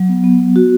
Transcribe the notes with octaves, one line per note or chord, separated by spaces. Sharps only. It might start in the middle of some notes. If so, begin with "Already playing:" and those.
Already playing: F#3
B3
B3
B3
F#4